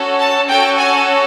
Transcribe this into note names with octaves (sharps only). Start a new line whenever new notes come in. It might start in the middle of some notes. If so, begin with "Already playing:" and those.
Already playing: C#4 F#4 A4
A5
C#4 F#4 A4 G5
G#5